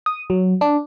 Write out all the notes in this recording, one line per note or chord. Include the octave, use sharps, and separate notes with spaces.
D#6
F#3
D4